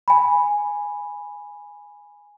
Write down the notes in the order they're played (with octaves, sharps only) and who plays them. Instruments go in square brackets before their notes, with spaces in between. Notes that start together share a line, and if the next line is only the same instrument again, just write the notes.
[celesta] G#5 B5